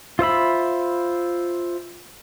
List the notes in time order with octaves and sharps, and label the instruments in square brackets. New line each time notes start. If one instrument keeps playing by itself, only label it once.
[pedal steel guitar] F4 C5 E5 B5